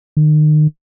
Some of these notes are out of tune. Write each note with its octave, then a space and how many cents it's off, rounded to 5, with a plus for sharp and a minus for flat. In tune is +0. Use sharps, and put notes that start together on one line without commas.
D#3 -35